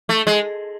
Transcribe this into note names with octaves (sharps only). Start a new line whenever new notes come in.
A3
G#3